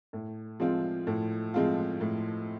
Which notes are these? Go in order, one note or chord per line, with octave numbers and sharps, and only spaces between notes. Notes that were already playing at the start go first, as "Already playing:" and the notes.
A2
F3 G#3 C4 F4
A2
F3 G#3 C4 F4
A2